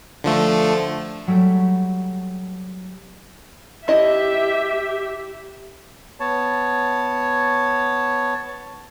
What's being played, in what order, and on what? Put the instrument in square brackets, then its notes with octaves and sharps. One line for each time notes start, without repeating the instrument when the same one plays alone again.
[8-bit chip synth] D3 F3 A3
[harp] F#3 G3 A3 D7
[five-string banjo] E4 D#5 A5 [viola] G4 E5
[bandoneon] B3 C#5 A5